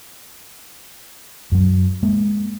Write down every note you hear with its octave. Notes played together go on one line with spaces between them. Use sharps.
F#2 F#3
G#3 A#3